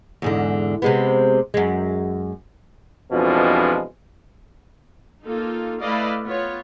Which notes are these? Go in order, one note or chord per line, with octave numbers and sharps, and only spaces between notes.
E2 G#2 D3
C3 G#3 B3
F#2 G#3
F2 B2 E3 F3 G#3 D4
A#3 D#4 F4 A4
A3 E4 B4 D5 D#5 F5
B3 F4 C#5